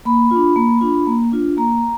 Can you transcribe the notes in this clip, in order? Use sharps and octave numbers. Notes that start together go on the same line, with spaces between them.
A#3 B5
D4 F4
A#3
D4 F4
A#3
D4 F4
A#3 A#5